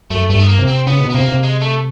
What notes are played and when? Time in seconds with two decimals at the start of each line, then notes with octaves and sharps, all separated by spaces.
0.10 F#2 A3
0.29 G2 A3
0.39 B3
0.48 A#3
0.58 C3
0.67 C4
0.87 C#3 B3
1.00 B2
1.10 B3
1.15 C3 A#3
1.28 C3
1.43 G#3
1.61 A3